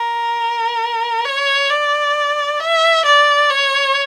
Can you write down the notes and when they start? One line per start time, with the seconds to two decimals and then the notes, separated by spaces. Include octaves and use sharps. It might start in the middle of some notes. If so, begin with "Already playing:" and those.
Already playing: A#4
1.26 C#5
1.71 D5
2.61 E5
3.06 D5
3.50 C#5